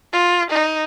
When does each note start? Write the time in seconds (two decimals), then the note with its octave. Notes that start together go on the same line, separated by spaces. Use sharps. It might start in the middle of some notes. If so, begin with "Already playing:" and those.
0.13 F4
0.50 D#4